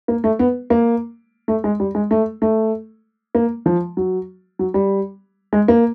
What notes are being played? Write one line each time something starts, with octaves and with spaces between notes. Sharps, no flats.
A#3
A3
B3
A#3
A3
G#3
G3
G#3
A3
A3
A#3
F3
F#3
F#3
G3
G#3
A#3